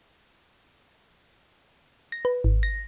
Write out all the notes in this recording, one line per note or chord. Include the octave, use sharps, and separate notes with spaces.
A#6
B4
G#1
A#6